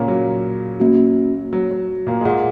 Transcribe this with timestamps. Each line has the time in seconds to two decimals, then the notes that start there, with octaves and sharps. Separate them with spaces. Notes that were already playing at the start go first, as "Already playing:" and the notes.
Already playing: A#2 C#3 A#3 C#4
0.08 F#3
0.80 A#3 C#4 F#4
1.53 F#3
1.71 F#3
2.07 A#2 A#3
2.21 G#3
2.25 A#2 A#3 G#4 D#5 F#5